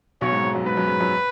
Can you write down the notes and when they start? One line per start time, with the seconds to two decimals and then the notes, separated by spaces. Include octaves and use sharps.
0.21 B1 B2 C#5
0.32 G#2
0.44 G#2
0.55 F#2
0.66 G#2 B4
0.77 F#2
0.88 G#2
1.01 F#2